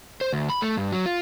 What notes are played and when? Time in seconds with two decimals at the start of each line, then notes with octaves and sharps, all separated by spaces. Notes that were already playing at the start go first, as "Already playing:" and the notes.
0.21 C5
0.33 D2
0.50 B5
0.62 A3
0.77 G2
0.92 F#3
1.06 F4